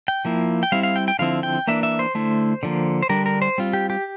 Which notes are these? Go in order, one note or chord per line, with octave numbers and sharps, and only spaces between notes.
G5
F3 A#3 E4
G5
G3 C4 E4 F5
F5
G5
G5
D3 F3 C4 E4 F5
G5
E3 A#3 D4 E5
E5
C5
D3 A3 E4
D3 F3 A#3
C5
D3 G3 D4 A#4
A#4
C5
G3 C4 F4
G4
G4